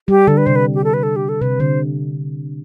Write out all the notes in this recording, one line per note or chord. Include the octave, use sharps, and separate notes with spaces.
G3 G4
D3 A4
B4
C3 C5
B4
G4
A4
B4
A4
G4
A4
C3 B4
D3 C5